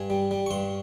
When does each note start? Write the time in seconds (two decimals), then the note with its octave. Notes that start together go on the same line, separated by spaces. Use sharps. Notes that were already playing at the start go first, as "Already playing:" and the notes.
Already playing: G2 G#5
0.10 G3
0.31 G3
0.46 C#6
0.51 G2 C6